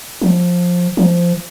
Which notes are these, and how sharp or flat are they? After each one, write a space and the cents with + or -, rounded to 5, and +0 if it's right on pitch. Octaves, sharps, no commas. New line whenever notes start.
F3 +15
F3 -10